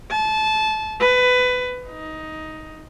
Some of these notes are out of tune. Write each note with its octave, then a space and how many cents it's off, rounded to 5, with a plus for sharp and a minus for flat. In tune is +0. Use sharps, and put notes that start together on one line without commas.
A5 -20
B4 +20
D#4 +10